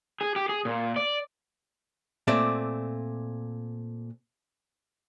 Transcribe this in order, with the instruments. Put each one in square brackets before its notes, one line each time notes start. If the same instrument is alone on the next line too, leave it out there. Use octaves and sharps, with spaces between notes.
[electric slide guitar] G#4
G4
G#4
A#2
D5
[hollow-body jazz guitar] A#2 A3 C4 D5